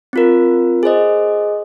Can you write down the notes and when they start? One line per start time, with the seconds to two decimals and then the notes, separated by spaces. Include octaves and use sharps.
0.13 C4 F4 A#4
0.83 G#4 C5 D#5